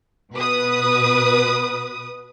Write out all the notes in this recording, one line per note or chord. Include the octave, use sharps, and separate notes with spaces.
B2 B4 D#6